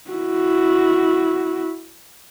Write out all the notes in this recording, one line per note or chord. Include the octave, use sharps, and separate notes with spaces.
E4 F#4